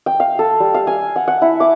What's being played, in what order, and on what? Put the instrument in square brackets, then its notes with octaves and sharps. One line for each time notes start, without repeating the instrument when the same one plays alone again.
[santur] G5
F5
A4
G3
F5
G#5
F#5
F#5
E4
D6